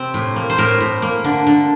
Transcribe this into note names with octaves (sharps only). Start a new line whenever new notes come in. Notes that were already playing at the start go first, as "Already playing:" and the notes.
Already playing: C3 C4
A2
A#3
C5
A2 A#4
A2
A#3
D3
D3